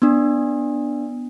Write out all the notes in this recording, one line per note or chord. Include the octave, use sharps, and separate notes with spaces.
B3 D4